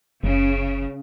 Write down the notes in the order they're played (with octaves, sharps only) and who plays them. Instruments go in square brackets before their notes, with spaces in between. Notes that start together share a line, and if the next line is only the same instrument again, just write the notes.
[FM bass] F#1 [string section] C#3